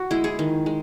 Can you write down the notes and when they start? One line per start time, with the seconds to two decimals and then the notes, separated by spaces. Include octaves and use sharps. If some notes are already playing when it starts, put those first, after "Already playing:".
Already playing: F#4
0.11 G#3 E4
0.24 G#4
0.39 D#3
0.66 G#3